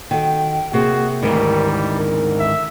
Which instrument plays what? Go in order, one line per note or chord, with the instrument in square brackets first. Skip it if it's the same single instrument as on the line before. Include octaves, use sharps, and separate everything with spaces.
[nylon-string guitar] D#3 F#4 A4 [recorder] G5
[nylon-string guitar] C3 A#3 C4 [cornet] F#4 [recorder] G#4
[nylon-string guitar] D2 [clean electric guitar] G#2 D#3 E3 [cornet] G3 [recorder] A#4
[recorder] A#4
[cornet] E5